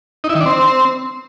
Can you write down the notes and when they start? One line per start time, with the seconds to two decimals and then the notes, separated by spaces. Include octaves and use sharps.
0.24 D#4
0.29 E4
0.35 D#3
0.40 D4
0.46 C4